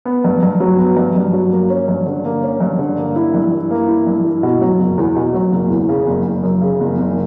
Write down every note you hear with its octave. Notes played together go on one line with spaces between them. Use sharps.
B3
G2
G2
F#3
B3
G2
G2
F#3
A#3
C#4
G2
D3
A#3
C#4
G2
D3
A#3
E4
G2
E3
A#3
E4
G2
E3
B2
F#3
F#1
E2
B2
F#3
F#1
E2
C#3
F#1
F#1
F#2
C#3
F#1
F#1